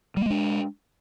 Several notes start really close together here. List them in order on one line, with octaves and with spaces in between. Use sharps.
G3 A#3 G#3 D4